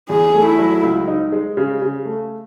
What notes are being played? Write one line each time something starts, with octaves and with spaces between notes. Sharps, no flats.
E2 G#4
A3
E4
F#3
C#2
D#4
G#3
C#3
C#3
A3